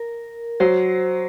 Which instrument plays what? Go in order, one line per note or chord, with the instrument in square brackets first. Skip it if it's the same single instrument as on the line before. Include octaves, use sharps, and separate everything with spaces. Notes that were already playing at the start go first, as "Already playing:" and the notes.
Already playing: [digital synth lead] A#4
[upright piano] F#3 [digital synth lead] C5